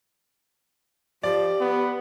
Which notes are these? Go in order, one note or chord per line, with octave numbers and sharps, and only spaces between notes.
F3 G4 D5
B3